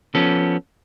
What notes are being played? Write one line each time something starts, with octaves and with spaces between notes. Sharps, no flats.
F3 B3 C#4 A4